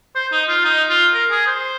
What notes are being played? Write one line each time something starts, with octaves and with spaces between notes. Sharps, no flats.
C5
D#4
F4
D#4
F4
A#4
G#4
C5